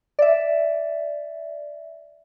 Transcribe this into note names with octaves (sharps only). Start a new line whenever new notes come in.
D5 E5